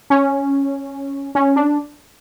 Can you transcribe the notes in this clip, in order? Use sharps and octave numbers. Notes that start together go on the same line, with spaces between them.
C#4
C#4
D4